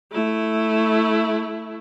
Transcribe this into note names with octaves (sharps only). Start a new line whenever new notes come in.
A3 E4